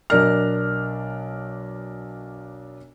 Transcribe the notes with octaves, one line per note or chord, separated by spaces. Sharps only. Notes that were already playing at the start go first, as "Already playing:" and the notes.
B1 D4 A#4 F6